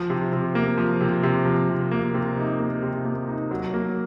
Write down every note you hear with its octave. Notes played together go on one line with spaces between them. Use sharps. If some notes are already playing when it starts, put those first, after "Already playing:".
Already playing: F3
C3
C3
A#3
F3
C3
C3
F3
C3
A#3
C3
D#4
A#3
C3
A#3
D#4
F#3
A#3